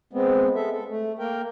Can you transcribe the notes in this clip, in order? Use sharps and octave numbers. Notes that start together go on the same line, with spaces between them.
G#3 B3 C4
G#3 A4 E5
A4
A3
A#3 A#4 G5